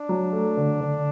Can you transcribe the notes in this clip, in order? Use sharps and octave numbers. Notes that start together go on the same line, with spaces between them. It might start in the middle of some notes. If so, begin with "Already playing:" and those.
Already playing: D4
F#3
A3
D3
D3